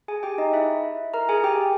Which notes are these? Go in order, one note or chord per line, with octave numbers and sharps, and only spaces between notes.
G#4 G#5
G4 G5
D#4 D#5
E4 E5
A#4 A#5
G#4 G#5
G4 G5